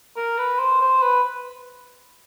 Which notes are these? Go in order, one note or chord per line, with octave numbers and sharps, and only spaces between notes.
A#4
B4
C5
C5
B4